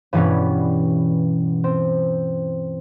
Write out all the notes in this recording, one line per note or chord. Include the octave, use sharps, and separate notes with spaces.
G2 B2 E3 G3 B3 C#4
C4